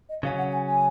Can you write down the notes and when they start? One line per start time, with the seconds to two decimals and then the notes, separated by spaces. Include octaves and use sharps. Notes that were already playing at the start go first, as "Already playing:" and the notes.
0.09 D#5
0.23 C#3 F#3 C#4 F5
0.38 F#5
0.52 G#5
0.66 G#5